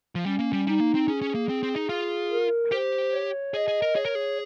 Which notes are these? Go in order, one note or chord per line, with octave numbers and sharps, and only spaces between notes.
F3
G3 C#4
A#3
G3
G3 D#4
A#3
C4
C#4 G#4
C#4
A#3
C4
C4
D#4
F4
A#4
G4 C5
C#5
G#4 D#5
G#4
A#4
G#4 C#5
A#4
G#4